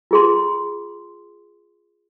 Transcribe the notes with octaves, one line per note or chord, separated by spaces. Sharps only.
F4 G#4 C6